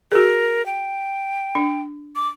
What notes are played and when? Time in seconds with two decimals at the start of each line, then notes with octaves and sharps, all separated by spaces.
0.12 F#4 G#4 A#4
0.66 G5
1.55 D4
2.16 D6